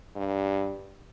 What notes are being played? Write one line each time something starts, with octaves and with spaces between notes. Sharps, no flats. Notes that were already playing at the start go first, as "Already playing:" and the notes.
G2